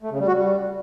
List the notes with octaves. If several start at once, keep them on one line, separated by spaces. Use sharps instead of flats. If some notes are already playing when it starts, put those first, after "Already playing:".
A3
C#3
G3
F#4
G3